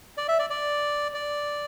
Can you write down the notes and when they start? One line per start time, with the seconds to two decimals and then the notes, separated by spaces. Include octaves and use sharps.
0.17 D5
0.28 E5
0.39 D5
0.50 D5
1.14 D5